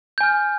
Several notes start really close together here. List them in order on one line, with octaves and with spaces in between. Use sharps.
G6 G#5 F6